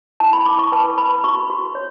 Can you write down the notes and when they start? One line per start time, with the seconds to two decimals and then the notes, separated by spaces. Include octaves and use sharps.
0.20 E4 A5
0.33 B5
0.46 E4 D6
0.59 C#6
0.72 B4 A5
0.97 B4 B5
1.24 F#4 C#6
1.50 F#4
1.75 C#5